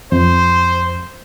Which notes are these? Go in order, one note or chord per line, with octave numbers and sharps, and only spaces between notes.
F2 C5